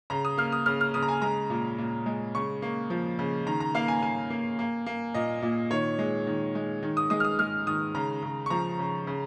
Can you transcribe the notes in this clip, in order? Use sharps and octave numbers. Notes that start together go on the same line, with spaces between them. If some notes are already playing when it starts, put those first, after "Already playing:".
C#3 A#5
D#6
A#3 F6
D#6
C#3 F6
F6
C#3 D#6
A#5
G#5
G#3 A#5
A#2
A#2
G#3
C#3 C#6
A#3
F3
C#3
D#3 A#5
A#5
A#3 F5
G#5
A#3 G#5
A#3
A#3
A#3
A#2 D#5
A#2
D#3 C#5
G#3
D#3
G#3
D#3
D#6
G#3 D#6
F6
D#6
G#3 F6
D#3 D#6
C#3 A#5
C#3
C#6
F3 A#5
C#3
C#3